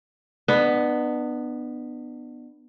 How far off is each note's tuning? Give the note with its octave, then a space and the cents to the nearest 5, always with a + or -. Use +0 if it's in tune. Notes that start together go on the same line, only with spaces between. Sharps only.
B3 +0 D4 +40 D#5 +10